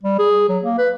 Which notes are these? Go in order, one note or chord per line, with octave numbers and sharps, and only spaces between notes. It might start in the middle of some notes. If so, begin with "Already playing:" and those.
G3
G#4
F#3
A#3
B4